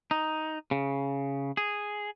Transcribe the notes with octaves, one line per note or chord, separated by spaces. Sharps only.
D#4
C#3
G#4